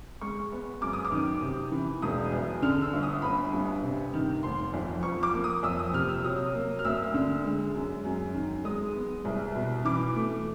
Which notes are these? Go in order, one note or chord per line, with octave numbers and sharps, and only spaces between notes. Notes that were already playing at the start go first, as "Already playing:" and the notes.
G#3 C#6
B3
F#2 D6
D#6
D6
D#3
C3
E3
E1 D#6
E2
D3 F6
E6
G1
D#6
G1 B5
G2
C3
D#3
F1 C6
F2
F3 C#6
D6
A#3
D#6
F2 E6
D#6
C3 F6
E6
F#3 D#6
A#3
F6
D2 E6
D3
G#3
F#2
F#2
D#3
G#3 D#6
B3
C2
B2
E3 D6
A3